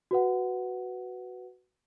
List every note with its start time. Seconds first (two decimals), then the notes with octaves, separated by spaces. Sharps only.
0.11 F#4 B4 F#5